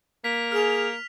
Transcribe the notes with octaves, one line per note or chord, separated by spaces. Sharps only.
A#3 B6
G#4 F6 F7